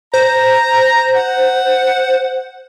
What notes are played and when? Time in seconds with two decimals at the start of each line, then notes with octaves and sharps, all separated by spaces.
0.14 C5 A#5
1.15 F#5